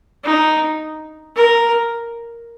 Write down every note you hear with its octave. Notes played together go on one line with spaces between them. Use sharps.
D#4
A#4